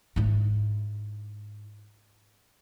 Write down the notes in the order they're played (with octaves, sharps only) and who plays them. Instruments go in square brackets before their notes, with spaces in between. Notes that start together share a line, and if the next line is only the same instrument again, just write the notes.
[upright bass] G#2 E4